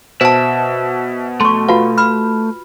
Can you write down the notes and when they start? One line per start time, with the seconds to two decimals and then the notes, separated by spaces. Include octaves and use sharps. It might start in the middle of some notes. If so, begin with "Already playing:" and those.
0.21 B2 C5 E5 A5
1.40 A3 C6 C#6
1.69 F4 F#4 B4 F5
1.98 B5 F6